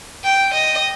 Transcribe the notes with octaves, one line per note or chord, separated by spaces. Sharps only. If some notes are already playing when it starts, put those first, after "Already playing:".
G5
D#5